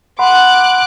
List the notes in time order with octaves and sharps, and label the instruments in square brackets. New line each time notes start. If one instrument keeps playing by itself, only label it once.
[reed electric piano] F#5 B5 C6 [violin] D6 F#6